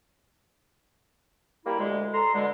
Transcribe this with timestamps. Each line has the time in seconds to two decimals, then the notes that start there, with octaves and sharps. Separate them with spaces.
1.65 G3 A#3 E4 G4
1.78 D2 G#3
2.13 A4 A#5 C6
2.34 B2 D3 G#3